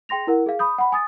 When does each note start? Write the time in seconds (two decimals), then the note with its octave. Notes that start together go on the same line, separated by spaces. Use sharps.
0.09 G#4 G5 C6 A#6 F7
0.27 E4 A#4 F#5
0.46 G#4 F5
0.59 B5 D#6 G6
0.78 F#5 B5
0.92 G#5 D#6 A6